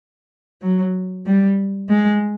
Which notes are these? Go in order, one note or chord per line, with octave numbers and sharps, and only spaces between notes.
F#3
G3
G#3